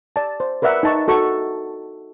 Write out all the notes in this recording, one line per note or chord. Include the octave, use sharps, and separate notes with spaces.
D5 A5
C5
A#4 B4 D5 E5 F#5
D#4 A5 C#6
F#4 A4 C#6